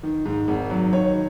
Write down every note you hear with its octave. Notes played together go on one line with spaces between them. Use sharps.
D#3
G#2
G#1
F#3
D#3 C#5